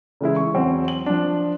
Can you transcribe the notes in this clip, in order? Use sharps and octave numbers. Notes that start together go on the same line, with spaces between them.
C#3 E3 G#3 E4
C#6
E2 F#3 C4
F#7
F3 D4